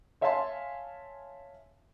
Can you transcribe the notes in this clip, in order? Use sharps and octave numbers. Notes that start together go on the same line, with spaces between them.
C#5 E5 F5 G#5 A5 C6